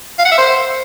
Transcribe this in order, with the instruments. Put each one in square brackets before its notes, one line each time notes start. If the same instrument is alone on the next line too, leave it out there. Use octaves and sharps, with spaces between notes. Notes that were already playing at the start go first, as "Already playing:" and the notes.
[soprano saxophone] F5
F#5
E5
C5